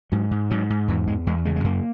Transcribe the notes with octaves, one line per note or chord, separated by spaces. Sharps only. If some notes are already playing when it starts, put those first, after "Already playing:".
G#2 F#3
G#2
G#2 F#3
G#2
E2 E3
E2 G#3
E2 G#3
C#3 G#3
G#3
F#2 A#3